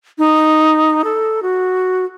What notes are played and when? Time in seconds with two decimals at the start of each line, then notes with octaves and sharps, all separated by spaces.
0.18 D#4
1.04 A4
1.43 F#4